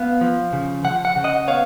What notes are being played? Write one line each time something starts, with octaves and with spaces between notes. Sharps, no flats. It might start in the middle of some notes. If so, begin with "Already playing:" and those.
Already playing: B3 F5
F3
C#3
F3 F#5
F#5
C#3
D#5 F#5
B3 C#5 F5